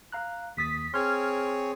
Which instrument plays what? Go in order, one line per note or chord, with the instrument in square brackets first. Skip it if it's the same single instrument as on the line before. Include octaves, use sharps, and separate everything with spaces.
[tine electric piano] F5 A#5 F#6
[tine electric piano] D#2 D#6 A6 [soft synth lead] B6
[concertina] C4 G#4 C#5 [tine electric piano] C6 G#6 [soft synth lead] F6